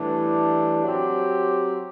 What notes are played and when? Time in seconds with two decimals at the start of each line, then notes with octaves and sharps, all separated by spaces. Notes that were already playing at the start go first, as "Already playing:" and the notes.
Already playing: A2 E3 G3 D4
0.84 F#3 C4 G4